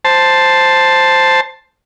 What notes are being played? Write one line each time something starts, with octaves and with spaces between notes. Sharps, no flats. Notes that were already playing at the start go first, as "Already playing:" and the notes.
C5 A5